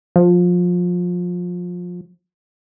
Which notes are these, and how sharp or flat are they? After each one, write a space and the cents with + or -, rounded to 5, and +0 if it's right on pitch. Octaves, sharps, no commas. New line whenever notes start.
F3 +25